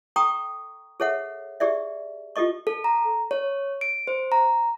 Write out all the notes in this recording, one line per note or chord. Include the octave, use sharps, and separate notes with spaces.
A4 G5 A#5 C#6 D#6
G#4 A4 C#5 E5 F#5
G4 G#4 D5 E5
F4 G4 A4 D#5 C#6
A4
A#5
C#5
D7
C5
A#5